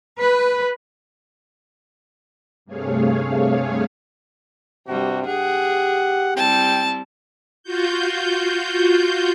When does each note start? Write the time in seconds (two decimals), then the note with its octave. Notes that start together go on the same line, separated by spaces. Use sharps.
0.20 B4
2.65 G2 C3 A3 G#4 C#5 F5
4.88 G2 C3 G3 F#4
5.27 G4 G#4 F#5
6.36 G3 C4 E4 G5 A5
7.63 F4 F#4 G6